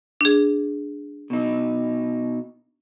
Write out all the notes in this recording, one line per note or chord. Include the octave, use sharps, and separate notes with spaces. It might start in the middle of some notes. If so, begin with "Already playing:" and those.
D4 G#4
B2 D#4